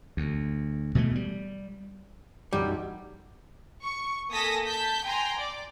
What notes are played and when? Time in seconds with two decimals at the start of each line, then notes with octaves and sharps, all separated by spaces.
0.17 D2
0.95 B2 E3 G#3 A3
1.15 G3
2.53 B1 F#2 E3 G3
3.82 C#6
4.32 A#3 A4 G#5 D#6 A#6 B6
4.66 A5 G6 B6
5.04 G5 G#5 A#5 C6
5.38 D5